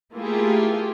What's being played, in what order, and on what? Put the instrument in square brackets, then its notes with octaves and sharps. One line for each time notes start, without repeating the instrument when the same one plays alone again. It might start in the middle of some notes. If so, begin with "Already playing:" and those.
[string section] A3 A#3 E4 F4 G4 G#4